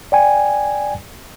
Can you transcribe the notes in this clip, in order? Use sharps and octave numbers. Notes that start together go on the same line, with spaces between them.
D5 G5 G#5